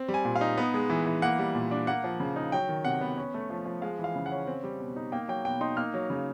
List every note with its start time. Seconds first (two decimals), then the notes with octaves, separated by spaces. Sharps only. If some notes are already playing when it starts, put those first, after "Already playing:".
Already playing: C4
0.08 G3
0.14 G#5
0.25 A#2
0.36 F5
0.41 D#4
0.57 B3
0.74 G#3
0.90 E3
1.06 E3
1.22 A#3 F#5
1.39 G3
1.55 A#2
1.71 D4
1.87 A#3 F#5
2.04 F3
2.20 C#3
2.36 D#4
2.52 F#3 G5
2.69 D#3
2.85 C3 F#5
3.01 B3
3.17 C#4
3.34 A3
3.50 F3
3.66 F3
3.82 G#3 F5
3.99 E3
4.04 F5
4.15 C#3
4.26 F#5
4.31 C#4
4.47 C4
4.64 G3
4.80 B2
4.96 D#4
5.12 A#3 G5
5.28 F#3 G5
5.45 B2 G5
5.61 D#4 C6
5.77 A#3 F6
5.94 F#3
6.10 C#3